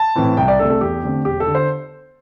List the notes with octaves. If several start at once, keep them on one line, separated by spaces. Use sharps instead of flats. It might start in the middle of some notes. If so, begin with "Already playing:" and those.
Already playing: A5
A2 E3 C4
C2 G5
D5
C3 A3 D4 A4
A4
E2 G4
D3 A3 C4
E1 G4
A4
D3
C5